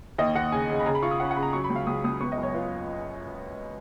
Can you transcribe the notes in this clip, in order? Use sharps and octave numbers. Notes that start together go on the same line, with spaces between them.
D#2 D#5
D#2 F#5
C#3 G#5
C#3
B5
C#3 A#5
B5
F4 C#6
D#6
C#4 F#5
F#5
C#3 B5
A#5
F#3 C#6
B5
C#2
F5
C#2 D#6
C#2 D#6
B3 C#6
D#5
F#2
C#5
F4 B4